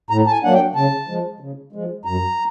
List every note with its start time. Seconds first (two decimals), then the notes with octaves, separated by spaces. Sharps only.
0.10 A2 A#5
0.27 A5
0.32 G#5
0.43 F#3 A#3 D4 F#5
0.53 G5
0.75 C#3 A5
1.08 F3 G#3
1.40 C#3
1.72 F3 G#3
2.05 F#2 A#5